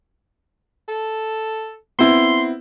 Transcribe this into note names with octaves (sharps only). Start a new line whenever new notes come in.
A4
B3 C4 E4 C6